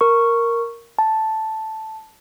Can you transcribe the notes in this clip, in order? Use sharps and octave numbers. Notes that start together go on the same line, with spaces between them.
A#4 C#6
A5